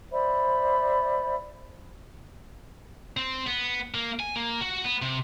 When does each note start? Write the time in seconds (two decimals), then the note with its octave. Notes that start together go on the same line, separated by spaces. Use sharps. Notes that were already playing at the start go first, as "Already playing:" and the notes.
0.12 C5 D5 E5 B5
3.17 C4
3.47 B3
3.94 A#3
4.20 G#5
4.36 A#3
4.61 F#4
4.84 B3
5.02 C3